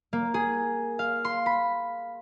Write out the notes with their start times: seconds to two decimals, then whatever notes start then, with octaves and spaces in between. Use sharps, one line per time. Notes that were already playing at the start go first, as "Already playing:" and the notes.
0.13 A#3
0.34 G#4
0.99 F5
1.25 C6
1.46 B5